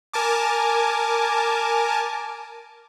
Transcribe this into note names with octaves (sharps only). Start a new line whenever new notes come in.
A#4 G#5 A5 D6